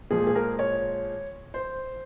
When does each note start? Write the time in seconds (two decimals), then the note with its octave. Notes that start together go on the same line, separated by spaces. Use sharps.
0.11 A#2 F3 G#3 G#4
0.27 G#4
0.35 A#4
0.59 C#5
1.54 C5